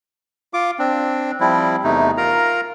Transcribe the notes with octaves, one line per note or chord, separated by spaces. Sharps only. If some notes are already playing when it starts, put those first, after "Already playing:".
F4 D6
C4 D4
F3 G3 C4 E4
E2 C3 A3 D#4
F4 A#4 A#5